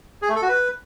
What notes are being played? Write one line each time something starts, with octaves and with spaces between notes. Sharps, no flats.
G#4
A3
A4
F#4
B4